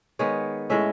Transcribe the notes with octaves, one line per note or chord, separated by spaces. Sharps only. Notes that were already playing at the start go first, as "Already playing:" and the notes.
D#3 G#3 B3 C#5
A2 G#3 C#4 E5